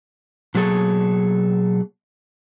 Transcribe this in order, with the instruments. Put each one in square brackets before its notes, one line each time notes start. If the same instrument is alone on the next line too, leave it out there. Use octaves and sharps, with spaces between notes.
[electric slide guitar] B2 F#3 A#3 G#4 A4 C#5